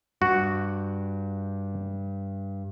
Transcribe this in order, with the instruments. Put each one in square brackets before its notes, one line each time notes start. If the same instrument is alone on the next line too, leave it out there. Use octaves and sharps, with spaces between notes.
[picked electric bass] G2 [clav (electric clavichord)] F#4